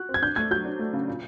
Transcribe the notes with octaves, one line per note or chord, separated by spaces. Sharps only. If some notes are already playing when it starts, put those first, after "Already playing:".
Already playing: F#4 F#6
C4
G#6
D4 G6
A3 G#6
F#3 G6
D4
A3
C#3
A#2